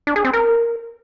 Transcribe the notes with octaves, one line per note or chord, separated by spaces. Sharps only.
D4
G#4
C4
A#4